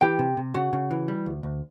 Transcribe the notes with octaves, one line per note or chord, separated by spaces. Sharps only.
E3 G4 G5
C3
C3
C#3 F#4 F#5
C#3
E3
G3
D2
D2